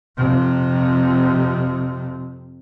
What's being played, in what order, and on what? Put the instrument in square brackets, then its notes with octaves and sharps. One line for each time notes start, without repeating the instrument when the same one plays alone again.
[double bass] F2 C3